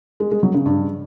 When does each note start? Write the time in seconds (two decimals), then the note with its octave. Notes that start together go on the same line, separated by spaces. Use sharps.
0.20 G#3
0.31 G#3
0.43 F#3
0.54 C#3
0.66 G2